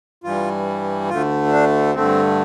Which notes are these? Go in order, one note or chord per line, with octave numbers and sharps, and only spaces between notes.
G2 E3 G3 F4
D2 D3 A3 F4
D4
G2 D3 A3 C4